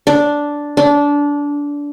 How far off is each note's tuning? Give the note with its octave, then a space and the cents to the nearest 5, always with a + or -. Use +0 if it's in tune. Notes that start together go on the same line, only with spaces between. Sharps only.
D4 -5
D4 -20